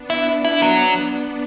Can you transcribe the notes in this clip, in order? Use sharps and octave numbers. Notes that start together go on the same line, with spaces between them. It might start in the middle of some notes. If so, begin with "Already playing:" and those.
Already playing: B3 D4
E4
E4
F#3